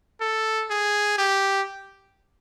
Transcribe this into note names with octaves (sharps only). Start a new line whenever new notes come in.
A4
G#4
G4